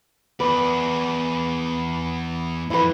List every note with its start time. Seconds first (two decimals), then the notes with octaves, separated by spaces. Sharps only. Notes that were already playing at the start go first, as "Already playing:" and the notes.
0.40 E2 B4 D5
2.70 F2 E4 B4